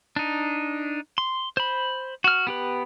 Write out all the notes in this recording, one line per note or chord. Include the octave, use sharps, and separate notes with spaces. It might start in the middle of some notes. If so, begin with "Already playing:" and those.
D4 D#4
C6
C5 B5
F#4 F6
B3 G4 B4